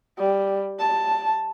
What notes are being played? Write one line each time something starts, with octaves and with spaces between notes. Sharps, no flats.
G3
A5